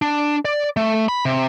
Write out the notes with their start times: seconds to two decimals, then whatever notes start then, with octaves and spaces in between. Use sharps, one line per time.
0.02 D4
0.45 D5
0.77 A3
1.09 B5
1.25 C3